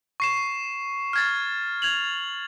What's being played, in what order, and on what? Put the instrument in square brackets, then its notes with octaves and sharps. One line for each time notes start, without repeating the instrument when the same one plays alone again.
[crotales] C#6 C7 E7
F6 G#6 A6
G#6 F7 F#7